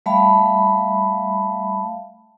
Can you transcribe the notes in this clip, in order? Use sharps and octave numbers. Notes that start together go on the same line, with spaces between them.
G3 A3 E5 F5 A5 B5